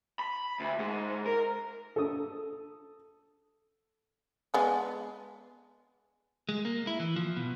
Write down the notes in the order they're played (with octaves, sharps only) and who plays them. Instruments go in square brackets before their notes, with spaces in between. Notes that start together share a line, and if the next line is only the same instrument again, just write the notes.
[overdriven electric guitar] B5
D2
G#2
A#4
[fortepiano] A4 D#6
[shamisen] G#3 B3 D4
[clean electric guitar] G#3
A#3
E4
E3
F3
B2